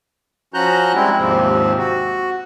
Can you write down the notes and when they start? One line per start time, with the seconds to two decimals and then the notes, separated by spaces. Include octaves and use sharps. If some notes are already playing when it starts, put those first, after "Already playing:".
0.54 F3 C#4 F#4 A#5 F#6 G6
0.95 G3 G#3 C4 E4
1.17 D#2 G#2 C3 F3 C4
1.78 F#4